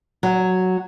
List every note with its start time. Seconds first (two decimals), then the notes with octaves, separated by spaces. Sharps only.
0.23 F#3